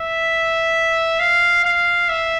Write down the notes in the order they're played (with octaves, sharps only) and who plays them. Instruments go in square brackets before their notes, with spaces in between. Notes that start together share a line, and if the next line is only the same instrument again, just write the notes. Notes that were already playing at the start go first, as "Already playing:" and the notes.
Already playing: [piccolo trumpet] E5
F5
F5
E5